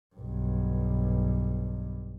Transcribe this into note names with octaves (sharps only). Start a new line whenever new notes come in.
B1 G2